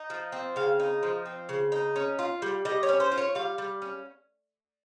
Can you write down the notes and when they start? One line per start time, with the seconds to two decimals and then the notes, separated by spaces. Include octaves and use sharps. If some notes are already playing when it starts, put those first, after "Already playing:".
Already playing: D#4
0.10 F3
0.32 C4
0.56 C#3 F5
0.80 D#4
1.03 F3
1.26 C4
1.49 C#3
1.72 D#4
1.96 C#4
2.19 F4
2.42 G3
2.65 G3 D#5
2.83 C#5
2.89 C#4
3.00 C5
3.12 F4
3.18 C#5
3.35 G3 F5
3.58 G3
3.82 C#4